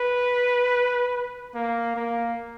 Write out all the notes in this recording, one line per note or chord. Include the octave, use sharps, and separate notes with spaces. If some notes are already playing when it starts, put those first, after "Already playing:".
Already playing: B4
A#3
A#3